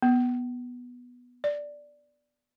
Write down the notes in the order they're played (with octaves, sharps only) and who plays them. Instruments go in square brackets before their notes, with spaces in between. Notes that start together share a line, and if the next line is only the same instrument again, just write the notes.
[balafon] B3
D5